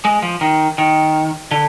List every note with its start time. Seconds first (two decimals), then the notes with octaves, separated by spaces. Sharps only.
0.05 G#3
0.22 F3
0.41 D#3
0.78 D#3
1.51 D3